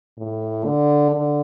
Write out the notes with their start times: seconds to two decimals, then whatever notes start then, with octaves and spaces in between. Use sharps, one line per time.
0.18 A2
0.65 D3
1.11 D3